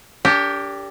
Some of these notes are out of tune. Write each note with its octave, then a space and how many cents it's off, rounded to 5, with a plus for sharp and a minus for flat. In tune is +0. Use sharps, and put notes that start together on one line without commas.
D4 -35 G4 +10 A#4 -40